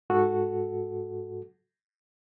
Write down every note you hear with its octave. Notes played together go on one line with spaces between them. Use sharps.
G#2 F#4 A4